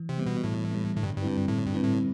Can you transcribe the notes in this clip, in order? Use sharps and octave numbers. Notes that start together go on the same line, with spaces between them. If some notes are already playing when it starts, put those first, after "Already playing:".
Already playing: E3
C3
G3 B3
B2
A2 E3
G3 B3
A2 D3
G2
G2
G3 C4 E4 B4
A2 D3
G2
G3 C4 E4 B4
A2